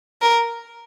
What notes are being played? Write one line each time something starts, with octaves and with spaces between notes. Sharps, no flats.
A#4